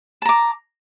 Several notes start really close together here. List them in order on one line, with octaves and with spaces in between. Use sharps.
A5 A#5 D6